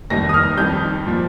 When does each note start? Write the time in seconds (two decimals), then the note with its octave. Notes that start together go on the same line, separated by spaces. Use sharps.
0.10 F1 D#2 D#3 G3 A#6
0.29 D#6
0.34 F6
0.57 F2 D#3 G3 G6
1.06 A#2 F3